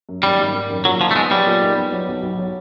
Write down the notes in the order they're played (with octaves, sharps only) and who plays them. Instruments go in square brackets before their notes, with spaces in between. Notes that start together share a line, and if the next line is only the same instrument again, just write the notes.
[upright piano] F#2
[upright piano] G#1 [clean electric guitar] G3
[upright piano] G#1
D#3
F#2
[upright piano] A#2 [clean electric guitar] F#3
[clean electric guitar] F3 [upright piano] D#4
[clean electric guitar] A3
[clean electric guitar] G#3 [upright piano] B3
[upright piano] F#3 [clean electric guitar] G3
[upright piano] A#2
D#4
B3
F#3
B1
B1
F#3